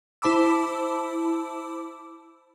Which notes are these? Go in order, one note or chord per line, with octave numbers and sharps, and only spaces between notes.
E4 C5 A5 B5 D6 E6